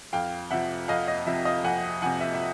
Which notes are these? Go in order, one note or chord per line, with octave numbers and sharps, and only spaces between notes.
F2 F5 G5
C3 F3 E5 F#5
F2 D#5 F5
D#5
C3 F3 E5
D#5 F5
F2 F#5 G#5
C3 F3 F#5 G#5
E5
E5